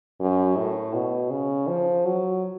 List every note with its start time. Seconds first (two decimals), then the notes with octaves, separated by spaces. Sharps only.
0.20 F#2
0.56 A2
0.94 B2
1.30 C#3
1.67 F3
2.05 F#3